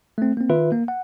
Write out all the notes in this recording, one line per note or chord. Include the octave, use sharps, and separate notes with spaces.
A3 C4
A#3 C4
D#3 F4 B4 E5
A#3
F#5